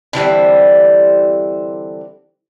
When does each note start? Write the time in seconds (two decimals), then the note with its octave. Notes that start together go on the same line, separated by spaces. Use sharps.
0.13 D3 E3 G3 C4